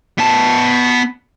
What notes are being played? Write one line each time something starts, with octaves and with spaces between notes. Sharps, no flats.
B3 A5